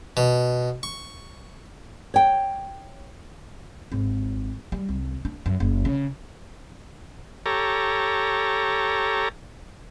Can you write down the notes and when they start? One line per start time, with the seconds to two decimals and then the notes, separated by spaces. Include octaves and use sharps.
0.17 B2
0.83 C#6
2.14 C#5 G5
3.92 G#1
4.72 G3
4.89 C2
5.25 D4
5.46 F#2
5.60 F#1
5.85 C#3
7.46 G4 A4 C#5 A#5